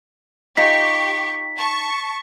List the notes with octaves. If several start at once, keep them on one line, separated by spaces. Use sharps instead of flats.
D#4 F4 G4 G#5 C#6 B6
A5 C#6